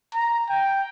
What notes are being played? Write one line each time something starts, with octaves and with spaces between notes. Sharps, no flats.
A#5
G5